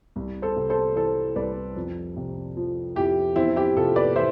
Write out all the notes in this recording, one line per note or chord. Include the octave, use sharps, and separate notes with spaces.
C2
A4 C5
C3
A4 C5
E3 A4 C5
C2 B4 D5
F2
C3
F3
F2 E4 G4
E2 C4 E4
E4 G4
C3 F4 A4
B4 D5
E3 C5 E5